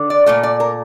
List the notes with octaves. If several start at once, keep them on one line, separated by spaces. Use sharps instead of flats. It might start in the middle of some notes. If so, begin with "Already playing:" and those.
Already playing: D3
D5
A#2 A3 D5
D5
A#4